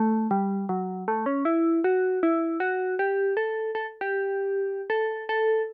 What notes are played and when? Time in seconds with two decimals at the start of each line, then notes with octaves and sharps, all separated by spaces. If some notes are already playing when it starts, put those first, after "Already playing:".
Already playing: A3
0.31 G3
0.69 F#3
1.08 A3
1.26 C#4
1.45 E4
1.84 F#4
2.23 E4
2.60 F#4
2.99 G4
3.37 A4
3.75 A4
4.01 G4
4.90 A4
5.29 A4